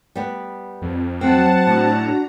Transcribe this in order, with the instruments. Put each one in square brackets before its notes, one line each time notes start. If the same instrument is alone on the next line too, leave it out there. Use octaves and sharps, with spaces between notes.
[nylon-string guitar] G3 B3
[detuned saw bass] F2
[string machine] F#3 [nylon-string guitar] C4 [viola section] F#5 A5
[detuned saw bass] A2 [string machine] D4 F#4 A#5